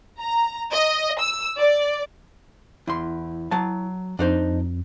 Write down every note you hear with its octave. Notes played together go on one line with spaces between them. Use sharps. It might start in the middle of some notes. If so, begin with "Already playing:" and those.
A#5
D#5
E6
D5
E2 E4 C6
F#3 A5
F2 D4 D#4 C5